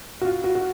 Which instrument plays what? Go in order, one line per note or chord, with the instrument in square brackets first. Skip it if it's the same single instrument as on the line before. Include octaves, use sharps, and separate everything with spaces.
[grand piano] F#4
F4
F#4
F#4